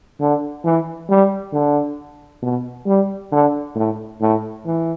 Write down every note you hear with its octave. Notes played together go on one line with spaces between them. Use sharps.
D3
E3
G3
D3
B2
G3
D3
A2
A2
E3